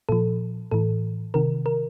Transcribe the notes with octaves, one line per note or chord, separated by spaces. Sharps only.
A#2 F3 A4
A2 E3 A4
C3 D#3 A#4
A#4